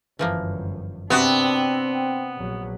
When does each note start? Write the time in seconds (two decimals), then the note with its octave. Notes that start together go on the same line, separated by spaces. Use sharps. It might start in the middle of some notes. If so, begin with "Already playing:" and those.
0.19 G1 F#2 E3 F3 A#3
1.10 C3 B3 C4 D4 F#4 D5
2.36 A#1 F#3